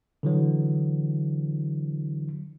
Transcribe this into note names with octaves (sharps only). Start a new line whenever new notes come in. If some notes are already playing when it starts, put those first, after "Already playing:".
D3 E3 F#3